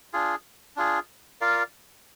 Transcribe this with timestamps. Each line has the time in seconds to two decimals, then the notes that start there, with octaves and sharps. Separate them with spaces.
0.13 D4 F4 G#4
0.76 D4 F4 G#4
1.41 F4 A#4 D5 F5